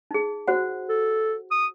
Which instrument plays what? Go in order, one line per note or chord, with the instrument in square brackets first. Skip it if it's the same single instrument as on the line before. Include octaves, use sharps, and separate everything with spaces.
[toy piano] D#4 G#4
F#4 C5 F#5
[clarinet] A4
D#6